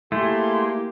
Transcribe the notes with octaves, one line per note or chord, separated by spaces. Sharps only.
A3 A#3 E4 G4 G#4 C6